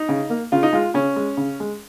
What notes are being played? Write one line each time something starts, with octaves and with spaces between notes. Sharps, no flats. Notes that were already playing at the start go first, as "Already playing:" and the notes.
Already playing: D#4
C#3
A#3
C#3 F4
D#4
G#3 F4
C#3 C#4
G#3
C#3
G#3